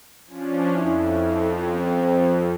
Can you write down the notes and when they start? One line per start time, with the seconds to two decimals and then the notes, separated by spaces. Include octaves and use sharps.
0.27 F3 C#4 D4
0.76 F2 E4
1.75 C4